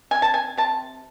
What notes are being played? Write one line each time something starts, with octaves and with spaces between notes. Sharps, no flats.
C3 G#5
A5
G#5
C3 A5